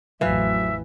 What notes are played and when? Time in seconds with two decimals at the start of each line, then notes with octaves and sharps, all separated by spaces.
0.21 A1 F2 E3 F#3 E5 F5